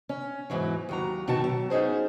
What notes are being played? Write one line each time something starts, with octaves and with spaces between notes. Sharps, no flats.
C#4
E2 G#2 E3 F#3
D#2 F#3 A#5
F#2 B2 D#3 F#4 A5
F#3
B3 C#4 D#4 G#4 C5